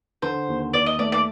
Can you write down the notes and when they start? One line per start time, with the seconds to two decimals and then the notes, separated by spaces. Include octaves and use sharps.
0.22 D3 C5
0.48 D#2
0.73 D#2 D5
0.86 D#5
0.99 A3 D5
1.12 D5